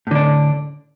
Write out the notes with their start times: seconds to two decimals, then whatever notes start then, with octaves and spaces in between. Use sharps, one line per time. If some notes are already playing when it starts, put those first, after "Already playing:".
0.07 A2
0.11 D3
0.15 D4